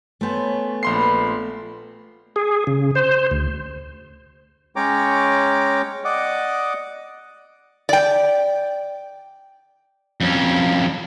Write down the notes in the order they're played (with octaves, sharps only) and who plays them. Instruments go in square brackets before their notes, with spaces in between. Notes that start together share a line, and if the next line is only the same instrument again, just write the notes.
[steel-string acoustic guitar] A3 B3 [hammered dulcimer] C#4 C5 G#5
[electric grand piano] A#1 C6 C7 [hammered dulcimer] F4 B4 C5
[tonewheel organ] G#4
C#3
C5
D2
[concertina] G#3 C#4 C#5 G5 A#5 D6
D5 D#5 F#5 D6
[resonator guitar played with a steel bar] D5 G5
[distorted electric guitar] F2 C#4